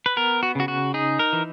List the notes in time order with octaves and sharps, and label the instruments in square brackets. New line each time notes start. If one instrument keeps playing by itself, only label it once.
[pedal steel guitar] B4
B3 A#4
F#4
C#3 F#4
F#4
D#4 G#4
A#4
E3